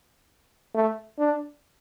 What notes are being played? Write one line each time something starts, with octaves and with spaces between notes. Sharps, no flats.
A3
D4